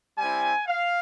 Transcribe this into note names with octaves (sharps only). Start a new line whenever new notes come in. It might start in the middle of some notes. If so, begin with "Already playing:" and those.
G3 C4 E4 G#5
F5